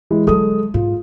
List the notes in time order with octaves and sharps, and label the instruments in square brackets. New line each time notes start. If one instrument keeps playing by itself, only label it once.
[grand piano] E3 G#3 E4
[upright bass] D3 F#3 [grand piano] G#3 A4 D#6
[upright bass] G#2 [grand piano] F4